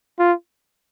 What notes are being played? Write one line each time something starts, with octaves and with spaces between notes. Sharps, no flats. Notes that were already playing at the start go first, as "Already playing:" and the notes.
F4